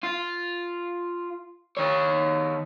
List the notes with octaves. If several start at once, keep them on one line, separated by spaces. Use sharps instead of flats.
F4
D#3 C#5